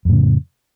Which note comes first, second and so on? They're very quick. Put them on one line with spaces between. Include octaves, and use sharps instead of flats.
F2 A2 C#3